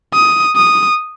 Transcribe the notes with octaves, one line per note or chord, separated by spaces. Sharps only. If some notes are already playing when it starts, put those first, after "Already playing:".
D#6
D#6